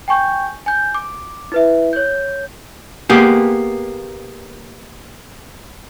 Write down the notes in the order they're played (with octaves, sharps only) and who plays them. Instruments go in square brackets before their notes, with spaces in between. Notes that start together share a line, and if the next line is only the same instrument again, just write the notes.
[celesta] G5 G#5 C#6 G6
G#5 G6
D6
E4 B4 E5
C#5 G6
[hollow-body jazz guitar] A#3 B3 G4 G#4